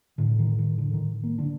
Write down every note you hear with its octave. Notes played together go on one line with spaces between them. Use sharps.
A2 D3
D#3
D#3
D3
D#3
A#3
D3 D4